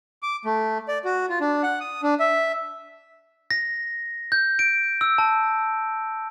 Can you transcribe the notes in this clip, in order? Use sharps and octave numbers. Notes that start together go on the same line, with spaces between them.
D6
A3
D5
F#4
F4
D4
F#5
D#6
D4
E5
A#6
G6
D7
E6
A5